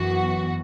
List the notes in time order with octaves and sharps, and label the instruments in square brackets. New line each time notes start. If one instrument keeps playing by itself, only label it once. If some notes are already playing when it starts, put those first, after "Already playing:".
Already playing: [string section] F#2 E3 B3 F#4